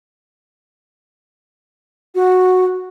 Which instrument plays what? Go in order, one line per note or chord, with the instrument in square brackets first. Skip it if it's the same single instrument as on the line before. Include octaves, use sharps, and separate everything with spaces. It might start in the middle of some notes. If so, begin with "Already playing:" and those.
[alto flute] F#4